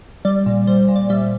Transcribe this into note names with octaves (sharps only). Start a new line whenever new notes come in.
G3 D5
A#2
G3 C5
A#2
D5
G3 E5